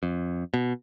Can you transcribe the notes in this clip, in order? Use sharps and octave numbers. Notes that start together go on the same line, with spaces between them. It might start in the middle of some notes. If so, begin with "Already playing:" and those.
F2
B2